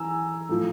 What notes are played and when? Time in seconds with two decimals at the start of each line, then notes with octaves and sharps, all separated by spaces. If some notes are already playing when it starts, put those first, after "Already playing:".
Already playing: E3 G#5 A#5 E6
0.49 A2 F3